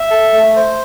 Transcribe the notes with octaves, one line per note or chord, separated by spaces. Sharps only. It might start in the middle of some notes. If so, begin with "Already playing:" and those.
Already playing: E5
A4
A3
C5